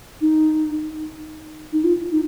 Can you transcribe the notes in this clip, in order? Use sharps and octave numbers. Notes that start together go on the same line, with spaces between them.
D#4
D#4
F4
D#4